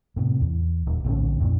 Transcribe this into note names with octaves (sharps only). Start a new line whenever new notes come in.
A2 C3
E2
D#1
A#1 A2 D3 C#4
F2 A#2